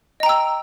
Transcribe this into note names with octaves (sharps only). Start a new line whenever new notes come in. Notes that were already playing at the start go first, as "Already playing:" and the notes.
D#5 G5 A#5 E6